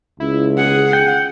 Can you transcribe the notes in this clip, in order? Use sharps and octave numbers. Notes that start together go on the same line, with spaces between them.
C#2 E4
G#4 F#5
G5